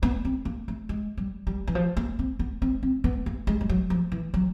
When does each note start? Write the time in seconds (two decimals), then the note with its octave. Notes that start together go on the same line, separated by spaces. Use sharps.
0.03 B3
0.25 C4
0.45 A#3
0.68 A3
0.89 G#3
1.17 G3
1.47 G3
1.67 E3
1.75 F3
1.97 A#3
2.19 C4
2.39 B3
2.62 C4
2.83 C4
3.04 B3
3.26 A#3
3.47 G#3
3.61 G3
3.69 F#3
3.90 F3
4.12 E3
4.34 F#3